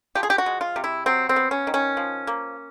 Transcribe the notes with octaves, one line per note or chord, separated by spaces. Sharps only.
F3 G4
G#4
G4
F#4
G#3
F4
C3
E4
F#3 C4
C4
B3
C#4
D#3
C#4
F3
A#3